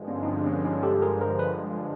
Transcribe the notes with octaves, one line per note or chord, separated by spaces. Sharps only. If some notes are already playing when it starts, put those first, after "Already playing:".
Already playing: G2 D3 F3 G#3
B3 C#4
D#4
C4 D4
D4
B3 C#4
C#4 D#4
G4 A4
G#4 A#4
A#4 C5
B4